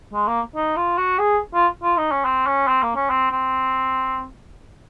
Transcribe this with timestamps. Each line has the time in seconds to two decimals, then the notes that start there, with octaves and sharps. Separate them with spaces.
0.14 G#3
0.28 A#3
0.56 D#4
0.77 F4
0.98 F#4
1.19 G#4
1.54 F4
1.83 F4
1.98 D#4
2.12 C#4
2.25 C4
2.47 C#4
2.68 C4
2.83 A#3
2.96 C#4
3.10 C4
3.31 C4